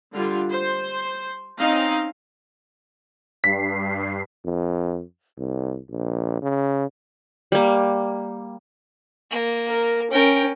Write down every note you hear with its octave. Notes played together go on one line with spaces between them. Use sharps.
D3 G3 F4
C5
C4 C#4 D#4 F5
G2 B6 C7
F2
C2
A#1
C#3
G3 A#3
A#3
A#4
C#4 A#4 G5